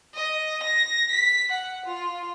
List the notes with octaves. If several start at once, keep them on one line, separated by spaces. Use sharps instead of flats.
D#5
A#6
B6
F#5
F4